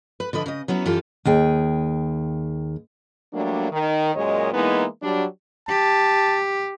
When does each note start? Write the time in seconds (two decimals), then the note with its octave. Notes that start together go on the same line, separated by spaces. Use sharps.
0.20 B4
0.33 D3 F3 B4 D#5
0.46 C#3 D#5
0.68 F#3 B3 C#4 E4
0.86 F#2 E3 F4 G4 A4
1.25 D#2 G#4 G5
3.33 F#3 G3 A3 A#3 D4
3.71 D#3
4.16 F#2 A#2 G#3 C#5 D#5
4.53 E3 G#3 A#3 B3 D#4 E4
5.02 F#3 G3 D4
5.68 G4 A5